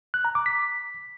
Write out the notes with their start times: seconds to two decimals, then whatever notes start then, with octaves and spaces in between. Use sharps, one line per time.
0.14 F#6
0.25 A#5
0.35 D6
0.46 B6